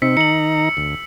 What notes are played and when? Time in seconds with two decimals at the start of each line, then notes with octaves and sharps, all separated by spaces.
0.02 C3 C4 D#4 E6 B6 C#7
0.17 D#3 D#4 A#5 C#7 F#7
0.77 D2